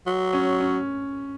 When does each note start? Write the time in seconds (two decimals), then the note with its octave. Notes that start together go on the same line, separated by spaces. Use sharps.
0.07 F#3
0.33 C#4
0.60 C#4